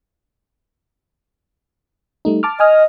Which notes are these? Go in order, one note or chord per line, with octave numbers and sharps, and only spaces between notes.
G3 A3 D#4
A5 D6 F6
D#5 G#5 D#6 F6